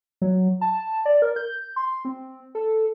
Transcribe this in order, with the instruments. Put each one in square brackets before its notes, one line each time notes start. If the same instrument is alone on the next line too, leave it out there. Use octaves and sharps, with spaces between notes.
[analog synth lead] F#3
A5
D5
A#4
G6
C6
C4
A4